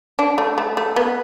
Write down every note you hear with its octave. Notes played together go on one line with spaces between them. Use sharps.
D4
A3
A3
A3
B3